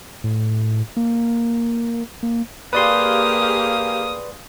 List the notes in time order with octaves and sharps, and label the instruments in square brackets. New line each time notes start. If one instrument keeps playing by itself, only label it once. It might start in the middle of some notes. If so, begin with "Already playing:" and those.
[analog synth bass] A2
A#3
A#3
[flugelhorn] A#3 [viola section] G4 G#4 F5 [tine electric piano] B4 D5 C6 [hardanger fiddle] D#6